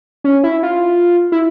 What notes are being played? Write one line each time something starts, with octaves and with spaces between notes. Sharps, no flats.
C#4
E4
F4
E4